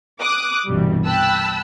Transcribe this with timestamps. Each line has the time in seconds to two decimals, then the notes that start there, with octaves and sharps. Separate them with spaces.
0.21 D6 D#6 F#6
0.67 G1 C2 G2 B2 E3 G3
1.05 G5 A5 B5 E6 F#6